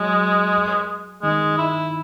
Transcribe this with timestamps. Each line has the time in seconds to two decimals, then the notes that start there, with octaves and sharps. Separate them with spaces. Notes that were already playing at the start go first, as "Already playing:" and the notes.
Already playing: F#3 G#3
1.22 D#3 G#3
1.58 E4